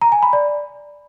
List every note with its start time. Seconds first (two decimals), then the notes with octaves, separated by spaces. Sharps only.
0.02 A#5
0.12 G#5
0.23 B5
0.33 D5